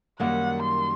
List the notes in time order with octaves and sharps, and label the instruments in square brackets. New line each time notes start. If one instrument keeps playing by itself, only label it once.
[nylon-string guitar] F#2 D#3 G3 A#3 [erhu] F#5
[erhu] C6